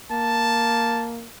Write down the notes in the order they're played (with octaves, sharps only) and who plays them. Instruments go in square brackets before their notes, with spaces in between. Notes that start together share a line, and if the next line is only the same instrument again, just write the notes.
[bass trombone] A#3 [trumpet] A5